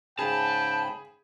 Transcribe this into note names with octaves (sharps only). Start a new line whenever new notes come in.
G#2 C#3 G#4 G5 A5 B5